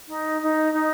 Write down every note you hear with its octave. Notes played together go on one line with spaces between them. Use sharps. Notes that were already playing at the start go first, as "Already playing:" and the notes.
D#4
D#4
D#4